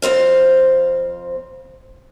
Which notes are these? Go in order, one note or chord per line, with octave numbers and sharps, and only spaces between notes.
F2 C4 C5 F5